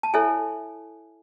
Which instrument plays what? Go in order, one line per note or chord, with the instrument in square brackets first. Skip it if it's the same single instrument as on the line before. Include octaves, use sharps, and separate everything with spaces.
[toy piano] A5
E4 A4 C#5 E5 G#5